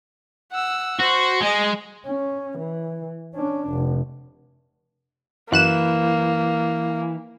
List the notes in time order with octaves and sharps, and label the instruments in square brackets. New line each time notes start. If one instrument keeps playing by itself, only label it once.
[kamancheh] F#5 E6
[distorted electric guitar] F#4 [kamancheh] C5
[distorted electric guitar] G#3 [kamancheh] D#5 G#5
[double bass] C#4
E3
C#4 D4
F1
[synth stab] F#2 F#6 E7 [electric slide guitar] E3 [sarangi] A#3